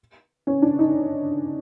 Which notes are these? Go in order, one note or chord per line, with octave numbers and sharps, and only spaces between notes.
C#4
D4
D#4